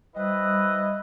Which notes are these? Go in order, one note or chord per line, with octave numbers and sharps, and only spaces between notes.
G3 E4 B4 C5 D#5